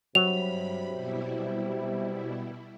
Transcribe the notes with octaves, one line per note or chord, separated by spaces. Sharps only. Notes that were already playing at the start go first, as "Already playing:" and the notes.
G2 C3 F#3 B5 F7
B2 G3 E4